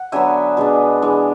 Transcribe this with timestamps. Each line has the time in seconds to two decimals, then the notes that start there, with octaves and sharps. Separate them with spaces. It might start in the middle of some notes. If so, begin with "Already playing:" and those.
Already playing: F#5
0.12 D3 F#3 B3 E5 G#5
0.57 B2 G#3 D4
1.02 E3 G#3 D4